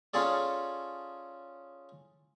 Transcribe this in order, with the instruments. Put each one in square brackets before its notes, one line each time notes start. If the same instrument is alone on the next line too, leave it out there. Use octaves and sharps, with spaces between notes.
[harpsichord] C#4 F4 G#4 A4 D5